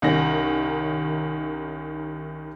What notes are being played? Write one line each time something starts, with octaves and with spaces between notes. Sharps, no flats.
C2 D#3 C#4 A#6